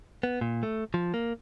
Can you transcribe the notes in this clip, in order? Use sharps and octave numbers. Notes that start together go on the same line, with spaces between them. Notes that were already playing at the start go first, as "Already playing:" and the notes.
B3
A#2
A3
F3
A#3